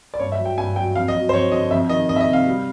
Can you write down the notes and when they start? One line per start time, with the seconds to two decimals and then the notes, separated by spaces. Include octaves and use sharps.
0.14 D5
0.19 G2 C#5
0.32 E5
0.39 F#3
0.45 G5
0.58 G2 G#5
0.76 F#3 G5
0.96 F2 F5
1.08 D#5
1.15 F#3
1.29 C5
1.33 F2 C#5
1.52 D3 D#5
1.71 F2 E5
1.89 D#3 D#5
2.09 F2 D#5
2.16 E5
2.21 D#5
2.27 C3
2.33 F5
2.47 G3